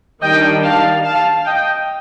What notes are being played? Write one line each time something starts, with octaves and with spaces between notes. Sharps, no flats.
D#3 G3 D4 D#5 G5
F5 A5
F5 A5
D#5 G5